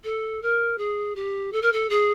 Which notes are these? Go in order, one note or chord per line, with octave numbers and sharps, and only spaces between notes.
A4
A#4
G#4
G4
A4
A#4
A4
G#4